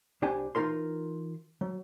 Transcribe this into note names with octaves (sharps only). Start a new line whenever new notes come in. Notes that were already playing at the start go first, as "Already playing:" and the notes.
C2 D4 G4 G#5
E3 D#4 F4 A#4 C6
F#3